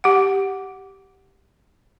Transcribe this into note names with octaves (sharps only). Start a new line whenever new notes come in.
G4 F#5